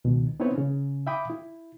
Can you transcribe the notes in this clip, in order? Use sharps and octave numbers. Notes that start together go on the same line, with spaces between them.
C#2 B2 D#3
B3 C4 D#4 E4 B4 C#5
C#3 C#4
E5 F5 G5 B5 D6 D#6
E4